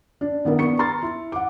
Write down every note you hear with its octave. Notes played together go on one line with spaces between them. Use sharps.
D4
D#3 B3 E4 A#4
B3 D4 C#6 C#7
A#5 C6 F6 A6
E4
F#5 D6